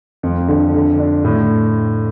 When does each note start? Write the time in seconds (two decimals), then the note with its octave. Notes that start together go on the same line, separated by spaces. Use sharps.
0.23 F2
0.48 D3
0.74 D3
0.99 D4
1.25 A2